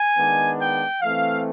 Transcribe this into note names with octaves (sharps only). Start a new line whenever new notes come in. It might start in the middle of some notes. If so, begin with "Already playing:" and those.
Already playing: G#5
D#3 G#3 B3 D4
G5
E3 A3 C4 F5